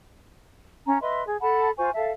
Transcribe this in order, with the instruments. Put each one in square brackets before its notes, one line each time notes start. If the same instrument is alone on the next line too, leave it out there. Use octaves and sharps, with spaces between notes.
[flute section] C#4 A#5
B4 D#5 E5 C6
G#4
A4 F#5 A5 B5
F4 C5 G#5 C#6
A4 E5 F5 A5